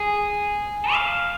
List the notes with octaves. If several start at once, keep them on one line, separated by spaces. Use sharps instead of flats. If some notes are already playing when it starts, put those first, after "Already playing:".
Already playing: G#4
F5